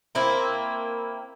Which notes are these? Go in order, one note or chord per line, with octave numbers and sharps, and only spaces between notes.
A#3 C4 E4